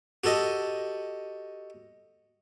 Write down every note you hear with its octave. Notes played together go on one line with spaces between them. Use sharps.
F#4 G4 A4 D#5